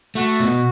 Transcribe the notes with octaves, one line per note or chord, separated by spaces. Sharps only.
A3 F#4
B2